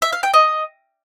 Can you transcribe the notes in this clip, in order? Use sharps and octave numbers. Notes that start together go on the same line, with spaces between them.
E5
F5
G5
D#5